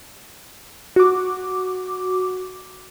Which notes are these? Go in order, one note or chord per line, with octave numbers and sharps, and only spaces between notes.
F#4 D6